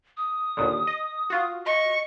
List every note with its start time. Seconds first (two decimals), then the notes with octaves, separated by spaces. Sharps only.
0.17 D#6
0.57 D#2 A#2 D3
0.87 D#5
1.30 F4 F#4
1.66 D#5 C#6